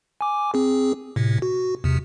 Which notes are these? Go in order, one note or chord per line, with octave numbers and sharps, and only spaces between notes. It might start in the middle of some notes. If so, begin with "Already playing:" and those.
G#5 D6
C4 G#4
A2 C3
F#4
E2 C3